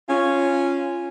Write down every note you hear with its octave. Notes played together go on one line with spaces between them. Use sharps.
C#4 F4